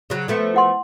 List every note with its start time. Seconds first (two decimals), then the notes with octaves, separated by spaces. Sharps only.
0.10 C#3 F#3
0.28 F3 A3 B3
0.54 E4 F#5 C6